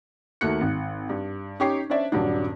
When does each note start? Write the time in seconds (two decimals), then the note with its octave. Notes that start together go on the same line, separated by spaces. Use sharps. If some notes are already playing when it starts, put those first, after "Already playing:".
0.41 D#2 A3 A#3 F#4 F#6 C#7
0.61 G#1
1.09 G2
1.60 C#4 D#4 G4 C#6 D6 C7
1.90 C#4 D4 C5 D5 E5
2.12 D#1 G2 F#3 D4